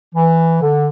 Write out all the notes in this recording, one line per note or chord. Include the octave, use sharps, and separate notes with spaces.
E3
D3